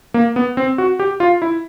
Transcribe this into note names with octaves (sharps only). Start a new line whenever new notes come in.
A#3
B3
C4
F#4
G4
F4
E4